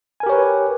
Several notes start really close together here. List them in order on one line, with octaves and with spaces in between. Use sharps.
G#5 A#4 G4 C#5 B4